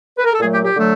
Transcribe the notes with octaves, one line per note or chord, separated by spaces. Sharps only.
B4
A#4
A4
A#2 F#3 A3 G#4
G4
G4
D3 F#3 A3